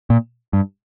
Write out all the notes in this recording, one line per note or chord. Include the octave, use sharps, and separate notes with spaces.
A#2
G2